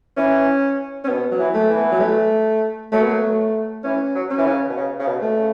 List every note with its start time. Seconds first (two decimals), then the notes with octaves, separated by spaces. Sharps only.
0.17 E3 C#4
1.04 C#4
1.08 B2 B3
1.31 F#3
1.39 E3
1.54 A3
1.70 E3
1.77 B3
1.92 F#3
2.00 A3
2.92 F#3 A3
3.02 B3
3.12 A3
3.84 E3 C#4
4.15 F#3
4.30 C#4
4.38 E3
4.45 C#3
4.69 B2
4.76 C#3
4.99 C#3
5.06 B2
5.22 A3
5.38 C#3